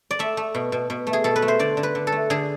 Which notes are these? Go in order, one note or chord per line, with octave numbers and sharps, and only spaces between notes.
D5
A3 E5
A3
B2
B2
B2
A3
G#4
B2 A4
B4
A3
C5
D3 D5
D3
B4
D3
A4
A3
D3 G#4